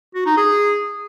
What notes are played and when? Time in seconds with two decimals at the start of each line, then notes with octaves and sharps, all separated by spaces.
0.15 F#4
0.26 D#4
0.37 G#4